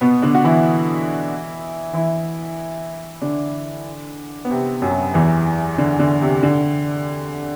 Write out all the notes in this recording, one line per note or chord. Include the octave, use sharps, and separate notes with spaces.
B2 B3
D3 D4
F#4
E3 E4
E3 E4
D3 D4
B3
C3 C4
F#2 F#3
E2 E3
D3
D3
C3
D3